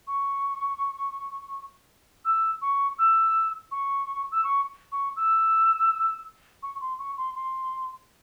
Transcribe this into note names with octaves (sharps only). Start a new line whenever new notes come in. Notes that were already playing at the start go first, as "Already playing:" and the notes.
C#6
E6
C#6
E6
C#6
E6
C#6
C#6
E6
C#6
C6
C#6
C6
C6